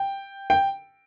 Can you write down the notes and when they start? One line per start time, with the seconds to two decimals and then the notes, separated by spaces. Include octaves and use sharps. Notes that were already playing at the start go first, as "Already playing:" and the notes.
Already playing: G5
0.50 G5